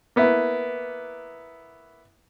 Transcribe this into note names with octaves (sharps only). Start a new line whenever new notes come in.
A#3 B3 E4